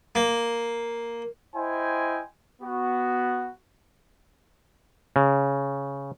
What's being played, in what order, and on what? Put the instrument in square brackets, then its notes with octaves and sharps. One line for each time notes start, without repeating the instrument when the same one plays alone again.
[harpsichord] A#3
[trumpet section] E4 C5 D#5 G5 G#5
B3 F#4
[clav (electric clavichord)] C#3